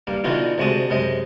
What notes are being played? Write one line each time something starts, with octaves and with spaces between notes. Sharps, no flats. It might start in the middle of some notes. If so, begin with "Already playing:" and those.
G2 A#3
B2 D3 E3 D#4 F4 F#4
D2 C3 G#3 F#4 A5 D#6
F#2 C3 G#3 D#5